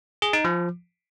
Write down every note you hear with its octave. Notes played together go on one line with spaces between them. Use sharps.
G#4
D#4
F3